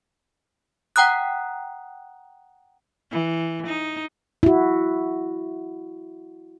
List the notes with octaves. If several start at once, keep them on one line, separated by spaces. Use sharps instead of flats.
F#5 G5 A#5 D#6 F#6
E3
D#4
E4 F#4